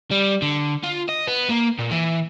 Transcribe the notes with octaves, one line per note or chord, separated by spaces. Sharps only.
G3
D3
F4
D#5
B3
A#3
A#2
E3